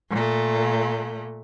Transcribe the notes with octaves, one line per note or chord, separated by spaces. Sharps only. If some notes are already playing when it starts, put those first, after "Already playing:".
A#2 A3